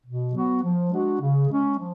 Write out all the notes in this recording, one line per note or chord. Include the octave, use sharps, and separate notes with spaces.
B2
F#3 B3 F#4
F3
G#3 D4 F#4
C#3
G#3 C#4
F3